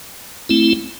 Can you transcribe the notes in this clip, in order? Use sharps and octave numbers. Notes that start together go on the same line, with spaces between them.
A3 C4 E4